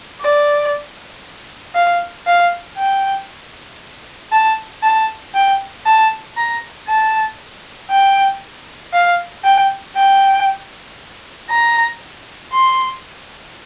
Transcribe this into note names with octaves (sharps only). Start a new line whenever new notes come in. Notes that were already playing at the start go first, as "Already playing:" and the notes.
D5
F5
F5
G5
A5
A5
G5
A5
A#5
A5
G5
F5
G5
G5
A#5
C6